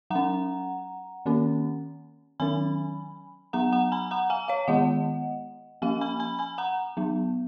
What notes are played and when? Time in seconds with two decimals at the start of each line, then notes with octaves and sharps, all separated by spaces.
0.10 F#3 C#4 F#5 A#5
1.26 D#3 A#3 C#4
2.40 D#3 F#3 C#4 G#5 B5
3.53 F#3 B3 F#5 A#5
3.72 F#5 A#5
3.92 G#5 B5
4.11 F#5 A#5
4.30 F5 G#5
4.48 C#5 F5
4.68 D#3 G#3 B3 D#5 F#5
5.82 F3 A#3 C#4 F5 G#5
6.01 G#5 B5
6.20 G#5 B5
6.39 G#5 B5
6.58 F#5 A#5
6.97 F#3 B3